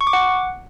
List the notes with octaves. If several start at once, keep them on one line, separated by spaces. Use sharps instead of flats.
C#6
D6
F#5